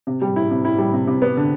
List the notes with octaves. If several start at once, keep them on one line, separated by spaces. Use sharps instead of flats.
C3
G3
E4
C3
E4
G3
C3
C3
B3
D3